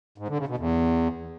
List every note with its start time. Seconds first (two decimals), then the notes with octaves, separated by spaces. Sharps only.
0.18 G#2
0.28 D3
0.38 C#3
0.48 B2
0.58 E2